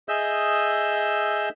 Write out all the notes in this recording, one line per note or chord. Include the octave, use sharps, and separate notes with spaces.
G#4 D#5 E5 E6 G6